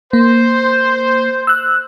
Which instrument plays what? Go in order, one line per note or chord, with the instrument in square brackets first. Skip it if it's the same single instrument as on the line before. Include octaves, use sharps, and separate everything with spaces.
[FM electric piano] A#3 [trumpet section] C5
[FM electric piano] E6 F#6